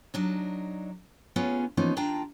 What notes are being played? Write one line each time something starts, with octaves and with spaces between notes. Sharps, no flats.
F#3 D4 D#4
B3 C#4 F4 G#4
E3 F3 A#3 B3 C#4 D#4
D#2 D4 F4 G5 A5 A#5